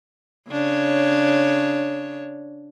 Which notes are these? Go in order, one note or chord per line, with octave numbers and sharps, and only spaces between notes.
C#3 D4 C#5